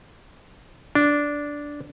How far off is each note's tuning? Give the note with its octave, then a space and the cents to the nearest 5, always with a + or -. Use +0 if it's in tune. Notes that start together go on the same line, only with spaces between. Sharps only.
D4 -10